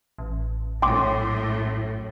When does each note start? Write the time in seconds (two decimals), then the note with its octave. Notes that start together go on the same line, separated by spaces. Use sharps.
0.18 A1
0.82 A#1 F#2 A2 G5 C6 D6